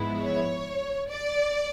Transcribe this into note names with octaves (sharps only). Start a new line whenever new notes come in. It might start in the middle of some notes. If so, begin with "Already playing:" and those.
Already playing: G#2 F3 G#3 B3 E4
C#5
D5